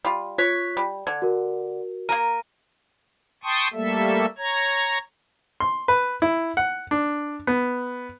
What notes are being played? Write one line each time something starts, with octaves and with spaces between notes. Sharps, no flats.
G3 F4
F4 C#5 F#6 B6
G3
D3 G#6
F#4 A#4
A#3 A#4 D#7
G5 A5 C6 C#6 D#6
G3 A3 A#3 A4 E5
C#5 A#5 G#6
C6
B4
E4
F#5
D4
B3